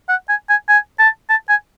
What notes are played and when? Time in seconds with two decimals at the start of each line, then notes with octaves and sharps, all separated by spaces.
0.09 F#5
0.29 G#5
0.49 G#5
0.69 G#5
0.99 A5
1.30 A5
1.49 G#5